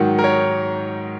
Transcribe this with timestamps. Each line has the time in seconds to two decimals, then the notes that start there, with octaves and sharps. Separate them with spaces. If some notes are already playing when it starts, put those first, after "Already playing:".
Already playing: G#2 D#3 F#3 F#5
0.19 A#4
0.24 C#5